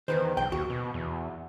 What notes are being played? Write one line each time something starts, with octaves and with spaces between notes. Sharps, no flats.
E2 D#3 B4 C5
B1 G5
D#2 F#4
B2
E2